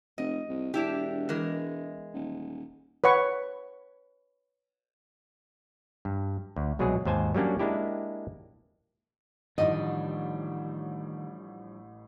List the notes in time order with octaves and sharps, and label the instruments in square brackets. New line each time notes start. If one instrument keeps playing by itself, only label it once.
[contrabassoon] F1 [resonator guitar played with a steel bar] D#5
[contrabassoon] C2
[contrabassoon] E1 [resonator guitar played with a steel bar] D4 E4 G4
[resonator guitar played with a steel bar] E3 G#3 A#4
[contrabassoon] D#1
[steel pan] B4 C#5 F#5 C#6
[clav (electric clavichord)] G2
D2
C2 B2 F#3 G#3 G#4
D#2 G#2 C5 G#5 A5
F#3 G3 A#3 C#4 D4
G#3 A#3 D4 E4 G4
[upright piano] A1 A2 [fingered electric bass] D#3 [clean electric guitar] F3 G3 D4 [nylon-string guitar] D#5